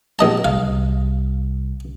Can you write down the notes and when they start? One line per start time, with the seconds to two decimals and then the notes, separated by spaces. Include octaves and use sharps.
0.19 A#1 D#5 A5
0.45 C2 F5